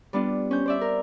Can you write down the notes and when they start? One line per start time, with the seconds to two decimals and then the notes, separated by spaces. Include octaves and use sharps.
0.13 G3 B3 D4 F4
0.51 C#4 C5 G6
0.66 C5 D5 E5
0.81 A#4